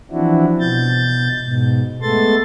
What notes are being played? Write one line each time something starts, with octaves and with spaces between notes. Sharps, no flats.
E3 F3 C4 D4 E4 F#4
B2 G6 A6
G#2 B2
G#3 A3 B3 A4 C6 A6